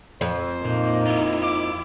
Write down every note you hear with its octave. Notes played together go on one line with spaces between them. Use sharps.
F2 C5
A#2 A#3 D#4
E4 F4
D6